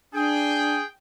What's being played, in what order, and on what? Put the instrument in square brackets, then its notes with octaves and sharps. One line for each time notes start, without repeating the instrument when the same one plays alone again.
[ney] D4 [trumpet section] G#4 G5